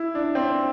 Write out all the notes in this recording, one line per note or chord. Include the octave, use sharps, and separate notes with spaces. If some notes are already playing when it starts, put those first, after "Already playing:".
Already playing: E4
D4
C4